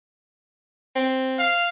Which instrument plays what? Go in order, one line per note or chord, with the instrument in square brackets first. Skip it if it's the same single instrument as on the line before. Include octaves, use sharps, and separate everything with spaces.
[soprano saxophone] C4
[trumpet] F5